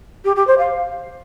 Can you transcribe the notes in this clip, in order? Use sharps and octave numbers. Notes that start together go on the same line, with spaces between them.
G4
G4
C5
F5